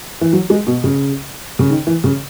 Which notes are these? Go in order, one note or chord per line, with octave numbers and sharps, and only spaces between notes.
E3
F#3
G#3
B2
C#3
C#3
D#3
E3
C#3